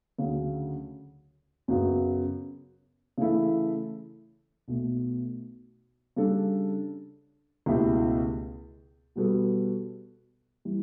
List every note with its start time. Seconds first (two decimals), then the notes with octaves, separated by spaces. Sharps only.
0.18 D2 C#3 F#3
1.68 F#2 C#3 F#3 B3
3.18 C#3 E3 A3 E4 A4
4.68 B1 B2 A3
6.16 C#3 G3 D4 A4
7.66 C#2 B2 A3 E4 G4
9.16 B2 G3 B3 F#4 A4
10.65 E3 G3